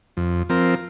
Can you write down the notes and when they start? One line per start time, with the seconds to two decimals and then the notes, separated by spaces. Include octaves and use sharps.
0.17 F2
0.49 F3 C4 A#4